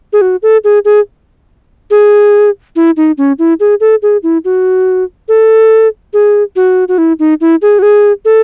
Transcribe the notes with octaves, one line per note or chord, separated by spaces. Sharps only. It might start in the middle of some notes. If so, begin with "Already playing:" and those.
G#4
F#4
A4
G#4
G#4
G#4
E4
D#4
C#4
E4
G#4
A4
G#4
E4
F#4
A4
G#4
F#4
F#4
E4
D#4
E4
G#4
F#4
G#4
A4